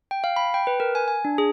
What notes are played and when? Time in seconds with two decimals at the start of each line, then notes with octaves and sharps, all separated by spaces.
0.11 G5
0.24 F5
0.36 B5
0.54 G5
0.67 B4
0.80 A#4
0.95 G#5
1.08 G#5
1.25 D4
1.38 G#4